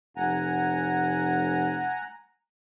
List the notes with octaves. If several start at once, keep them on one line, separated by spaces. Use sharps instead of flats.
F1 F#5 G#5 A#5